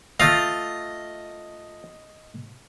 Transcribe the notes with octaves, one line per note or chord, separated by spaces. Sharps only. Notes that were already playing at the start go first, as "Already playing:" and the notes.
A3 F4 D#5 F5